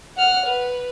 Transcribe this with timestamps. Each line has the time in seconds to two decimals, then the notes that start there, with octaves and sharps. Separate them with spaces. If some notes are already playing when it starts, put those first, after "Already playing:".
0.17 F#5 F6
0.46 B4